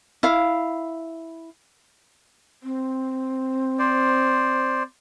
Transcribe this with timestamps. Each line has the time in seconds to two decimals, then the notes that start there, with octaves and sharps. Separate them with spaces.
0.23 E4 F5
2.63 C4
3.79 C5 D5